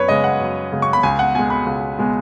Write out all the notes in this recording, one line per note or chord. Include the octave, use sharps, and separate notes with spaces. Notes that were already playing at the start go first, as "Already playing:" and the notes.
Already playing: F#2 B4 C#5
C#3 G#3 D#5
F#5
F#2
C#3 G#3
C#6
B5
C#2 G#5
F#5
B2 G#3 G#5
B5
C#2
B2 G#3